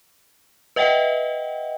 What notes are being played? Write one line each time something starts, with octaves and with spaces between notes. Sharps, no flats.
B4 D#5 E5 F#5 G5